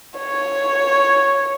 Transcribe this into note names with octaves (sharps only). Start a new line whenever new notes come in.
C#5